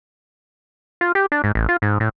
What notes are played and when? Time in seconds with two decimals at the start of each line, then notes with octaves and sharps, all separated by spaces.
1.01 F4
1.15 G4
1.32 D4
1.44 G#2
1.55 A1
1.69 F4
1.82 G#2
2.00 A2